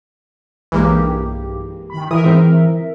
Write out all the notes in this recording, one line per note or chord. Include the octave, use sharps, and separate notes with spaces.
B1 G2 E3 G#3 A#3 G4
D#3 B5
E3 A#4 E5 D#6
G#2 C4